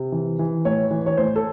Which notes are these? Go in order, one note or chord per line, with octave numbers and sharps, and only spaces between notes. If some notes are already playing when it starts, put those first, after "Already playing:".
Already playing: C3
E3
E3
A2 C#5
E3
C#5
A2 C5
A4